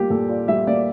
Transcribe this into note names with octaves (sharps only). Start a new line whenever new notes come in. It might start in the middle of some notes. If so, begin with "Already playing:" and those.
Already playing: G3 A#3 F4 G4
A#2 A4
F4 D5
G3 E5
A#3 D5